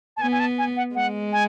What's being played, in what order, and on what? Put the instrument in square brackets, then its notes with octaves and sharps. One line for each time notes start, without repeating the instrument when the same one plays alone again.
[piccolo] A5
[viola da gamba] B3 [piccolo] G#5
[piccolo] G#5
A5
G#5
F#5
[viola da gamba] G#3 [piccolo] F#5
[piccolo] G#5